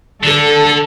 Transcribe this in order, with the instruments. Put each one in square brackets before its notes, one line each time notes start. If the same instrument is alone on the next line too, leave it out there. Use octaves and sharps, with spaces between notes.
[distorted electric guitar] D3 [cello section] A4